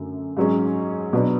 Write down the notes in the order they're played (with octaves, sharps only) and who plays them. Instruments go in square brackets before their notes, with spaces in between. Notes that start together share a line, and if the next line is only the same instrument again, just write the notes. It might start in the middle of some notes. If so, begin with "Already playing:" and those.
Already playing: [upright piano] F#2 D3 A3
G#2 F#3 C#4 G#4
B2 F#3 B3 D4